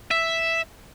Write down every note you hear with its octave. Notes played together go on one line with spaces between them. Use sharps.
E5